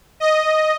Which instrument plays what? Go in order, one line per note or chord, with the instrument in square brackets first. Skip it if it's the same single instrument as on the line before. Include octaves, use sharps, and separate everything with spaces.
[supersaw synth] D#5